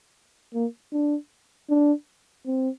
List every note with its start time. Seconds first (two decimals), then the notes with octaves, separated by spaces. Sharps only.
0.54 A#3
0.92 D4
1.69 D4
2.46 C4